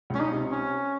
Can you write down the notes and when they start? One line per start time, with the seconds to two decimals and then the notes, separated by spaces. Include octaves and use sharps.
0.10 C#2 C#4
0.20 D#4
0.31 C3
0.52 C#4